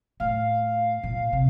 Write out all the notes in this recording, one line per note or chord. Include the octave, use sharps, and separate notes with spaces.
A2 F5
A#2
C3